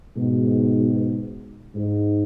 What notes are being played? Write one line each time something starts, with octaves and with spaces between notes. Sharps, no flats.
G#2 B2
G#2